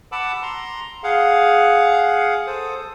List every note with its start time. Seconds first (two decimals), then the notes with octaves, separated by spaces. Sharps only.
0.12 F#5 A5 B5 D6 E6
0.43 A#5 C6
1.04 G#4 F5 F#5
2.47 A4 C5 D#6